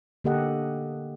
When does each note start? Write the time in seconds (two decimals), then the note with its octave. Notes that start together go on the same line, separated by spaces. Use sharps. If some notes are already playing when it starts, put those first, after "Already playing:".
0.24 D3 A#3 G4 A4 D#5 F#5